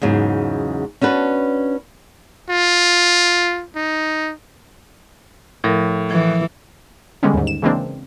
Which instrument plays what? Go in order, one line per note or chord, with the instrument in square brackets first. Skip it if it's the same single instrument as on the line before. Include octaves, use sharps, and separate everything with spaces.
[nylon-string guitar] E2 G#2 C#3 F#3
C#4 D4 F#4 B4
[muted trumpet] F4
D#4
[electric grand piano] A2 [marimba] F3 A4 A#4
[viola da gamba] E3 [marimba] F3
[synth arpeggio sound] D3 G3 G#3 B3 C#4
D#2 G#2
E7
C#3 E3 G#3 A#3 C4 D4